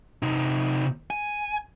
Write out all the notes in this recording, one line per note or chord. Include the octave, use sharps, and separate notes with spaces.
C3 D#4
G#5